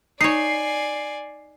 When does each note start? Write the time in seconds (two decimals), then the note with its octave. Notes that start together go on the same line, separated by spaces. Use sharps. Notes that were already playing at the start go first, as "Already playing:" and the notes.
0.21 D#4 C#5 D5 G#5 C7